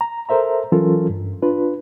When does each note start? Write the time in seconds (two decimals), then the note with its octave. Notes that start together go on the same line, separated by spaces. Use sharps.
0.01 A#5
0.29 A4 A#4 C5 E5 A#5
0.72 E3 F#3 C#4 F4 A4 A#4
1.10 G2
1.42 D4 F4 B4